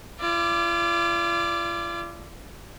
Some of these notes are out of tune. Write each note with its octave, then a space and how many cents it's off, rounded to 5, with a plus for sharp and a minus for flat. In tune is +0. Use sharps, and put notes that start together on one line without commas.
F4 -40 D5 +0